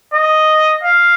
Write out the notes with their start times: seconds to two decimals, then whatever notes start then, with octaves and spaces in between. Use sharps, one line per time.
0.14 D#5
0.84 F5